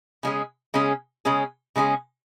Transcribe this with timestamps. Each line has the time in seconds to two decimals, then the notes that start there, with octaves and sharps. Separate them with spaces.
0.23 C#3 G#3 C#4 G#4
0.74 C#3 G#3 C#4 G#4
1.25 C#3 G#3 C#4 G#4
1.76 C#3 G#3 C#4 G#4